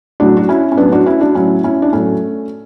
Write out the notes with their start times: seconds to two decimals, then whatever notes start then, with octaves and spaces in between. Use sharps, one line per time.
0.20 A2 F#3 D4 F#4
0.37 F#4
0.49 C#4 E4
0.72 C#4
0.77 A2 F#3 B3 D4
0.92 D4 F#4
1.06 C#4 E4
1.21 D4 F#4
1.35 A2 F#3 C#4 E4
1.64 C#4 E4
1.82 D4
1.93 A2 F#3 A3 C#4